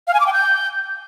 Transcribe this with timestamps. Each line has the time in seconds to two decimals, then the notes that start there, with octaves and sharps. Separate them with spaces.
0.07 F5
0.14 G#5
0.20 D6
0.26 G5
0.33 G6